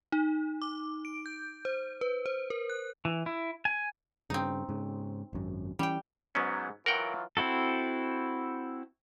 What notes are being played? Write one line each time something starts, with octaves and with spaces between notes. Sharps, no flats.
D#4
D6
D7
G6
C5
B4
C5
A#4
F#6
E3
E4
G#5
G2 C#3 C4 D#4
G#2 C#3
G#1 F#2
E3 G3 C#4 G5
G#2 F#3 B3 C#4
E3 F#3 F4 A#4 F#5 G5
C4 E4 F#4 A4